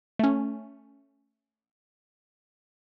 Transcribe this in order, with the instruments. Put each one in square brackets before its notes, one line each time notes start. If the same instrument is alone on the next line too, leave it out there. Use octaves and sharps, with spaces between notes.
[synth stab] A3 C#4